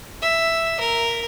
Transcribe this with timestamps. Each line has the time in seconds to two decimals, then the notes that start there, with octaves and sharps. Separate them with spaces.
0.22 E5
0.80 A#4